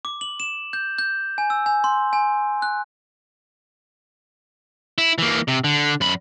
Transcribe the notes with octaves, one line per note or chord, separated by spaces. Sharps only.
D6
F#7
E7
G6
G6
G#5
E6
G#5
C6
G#5
F#6
E4
E3 A#3
C3
D3
F#2 B5